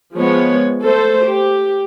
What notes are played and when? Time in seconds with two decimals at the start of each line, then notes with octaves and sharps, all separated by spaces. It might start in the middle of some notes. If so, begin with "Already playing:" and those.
0.15 F3 G#3 B3 C#5
0.82 A3 A4 C5
1.24 G4